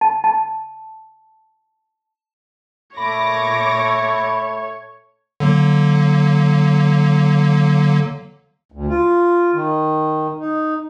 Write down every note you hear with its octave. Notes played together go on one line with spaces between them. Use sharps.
A5
A5
A#2 A3 C#5 B5 D6 A#6
D3 F#3 A#3
D2
F4
D#3
D#4